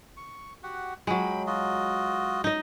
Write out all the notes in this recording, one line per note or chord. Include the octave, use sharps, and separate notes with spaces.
C#6
F#4 G4 F#5
F#3 G#3 G5 B5
F4 F#4 D#5
D#4 D#5